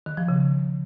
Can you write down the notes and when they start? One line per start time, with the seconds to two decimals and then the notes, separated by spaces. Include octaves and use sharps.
0.06 D#3
0.17 F3
0.28 C#3